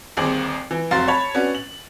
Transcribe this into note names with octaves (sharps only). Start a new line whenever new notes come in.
G1 D#2 C4 G#4 D6 F#7
E3
F1 F#3 F5 C6 A6
C#5 A5 B5
B3 C#4 D4 F#4
F#7